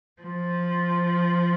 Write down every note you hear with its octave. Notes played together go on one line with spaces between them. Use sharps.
F3